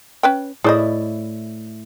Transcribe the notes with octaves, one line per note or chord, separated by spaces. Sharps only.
C#4 B4 G5
A2 E4 G#4 C5 D5 D#5